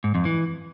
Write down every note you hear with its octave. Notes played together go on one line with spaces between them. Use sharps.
G#2
F2
E3